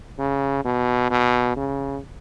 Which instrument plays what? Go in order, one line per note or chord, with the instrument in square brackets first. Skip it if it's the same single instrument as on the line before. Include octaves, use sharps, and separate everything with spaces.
[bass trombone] C#3
B2
B2
C#3